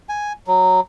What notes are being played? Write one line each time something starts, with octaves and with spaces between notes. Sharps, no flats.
G#5
F#3